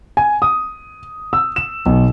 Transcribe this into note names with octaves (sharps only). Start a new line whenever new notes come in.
G#5
D#6
E6
E7
B1